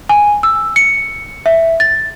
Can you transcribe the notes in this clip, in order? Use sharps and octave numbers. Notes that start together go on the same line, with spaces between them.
G#5
E6
C#7
E5
A6